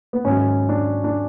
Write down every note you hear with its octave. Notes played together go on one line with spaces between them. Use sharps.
B3
G#1 G#2 F#3 C#4
D4
D4